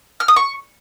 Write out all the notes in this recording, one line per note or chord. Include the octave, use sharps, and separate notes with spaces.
F6
D#6
C#6